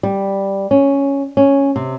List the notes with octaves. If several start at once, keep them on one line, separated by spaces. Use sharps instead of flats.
G3
C#4
C#4
C3